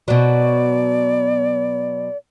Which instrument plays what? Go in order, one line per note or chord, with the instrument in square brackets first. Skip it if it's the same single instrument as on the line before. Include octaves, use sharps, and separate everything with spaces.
[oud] B2 F#3 [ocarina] D5